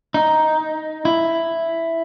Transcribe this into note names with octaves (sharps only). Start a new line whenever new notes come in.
D#4
E4